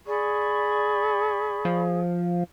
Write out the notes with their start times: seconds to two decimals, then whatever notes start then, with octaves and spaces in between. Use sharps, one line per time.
0.07 G#4 D5 B5 C#6
1.65 F3